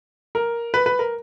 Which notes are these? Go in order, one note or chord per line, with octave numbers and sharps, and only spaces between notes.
A#4
B4
B4
A#4